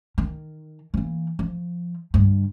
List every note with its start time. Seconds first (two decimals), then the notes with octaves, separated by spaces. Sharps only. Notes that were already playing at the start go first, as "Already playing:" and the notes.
0.18 D#3
0.94 E3 A#3
1.39 F3
2.14 G2 D3